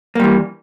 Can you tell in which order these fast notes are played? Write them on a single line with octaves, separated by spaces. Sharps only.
A#3 G3 E3